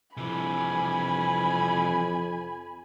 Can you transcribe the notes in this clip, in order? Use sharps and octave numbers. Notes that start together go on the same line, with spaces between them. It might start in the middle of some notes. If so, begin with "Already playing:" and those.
F2 C3 E3 G#5 B5